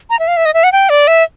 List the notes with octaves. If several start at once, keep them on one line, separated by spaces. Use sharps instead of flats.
A#5
E5
F5
E5
D#5
E5
F#5
G5
D5
E5